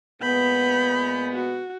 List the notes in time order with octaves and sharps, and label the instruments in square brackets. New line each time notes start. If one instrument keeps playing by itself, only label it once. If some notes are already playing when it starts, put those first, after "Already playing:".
[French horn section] A#2 G#3 B3 [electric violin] B5 G6
[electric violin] F#4